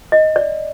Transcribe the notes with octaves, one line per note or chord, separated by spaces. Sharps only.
D#5
D5